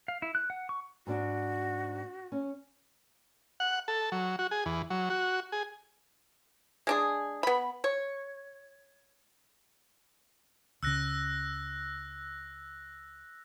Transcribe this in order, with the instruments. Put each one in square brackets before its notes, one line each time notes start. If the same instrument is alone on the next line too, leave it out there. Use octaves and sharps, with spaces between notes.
[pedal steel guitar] F5
E4
F#6
F#5
C#6
[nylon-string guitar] G#2 D4 [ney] F#4
[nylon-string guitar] C#4
[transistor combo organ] F#5
A4
F#3
F#4
G#4
E2
F#3
F#4
G#4
[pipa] G#3 D4 G#4
B3 B5
C#5
[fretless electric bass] C#2 C#3 [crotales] E6 F#6 A#6